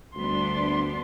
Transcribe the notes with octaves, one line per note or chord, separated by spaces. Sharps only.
D2 G3 B3 D4 C6